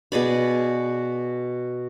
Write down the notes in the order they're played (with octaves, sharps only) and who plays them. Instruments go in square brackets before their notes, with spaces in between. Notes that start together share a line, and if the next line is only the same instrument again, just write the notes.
[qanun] B2 G#4 D5 B5